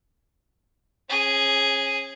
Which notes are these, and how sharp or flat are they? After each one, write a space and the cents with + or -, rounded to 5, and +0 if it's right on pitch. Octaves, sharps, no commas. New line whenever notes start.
C#4 -30 G#4 +0